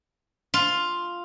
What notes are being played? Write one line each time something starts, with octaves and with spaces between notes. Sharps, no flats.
F4